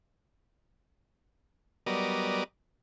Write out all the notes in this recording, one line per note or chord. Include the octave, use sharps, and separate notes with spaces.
F#3 G3 B3 A#4 D5 D#5